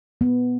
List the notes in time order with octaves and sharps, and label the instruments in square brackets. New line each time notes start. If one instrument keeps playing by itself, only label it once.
[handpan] B3